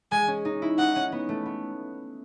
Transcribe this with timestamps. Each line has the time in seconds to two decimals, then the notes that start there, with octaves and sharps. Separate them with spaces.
0.12 G#3 G#5
0.28 C#4
0.45 D#4
0.62 E4
0.78 D#4 F#5
0.96 C#4
1.12 B3
1.29 A3
1.46 B3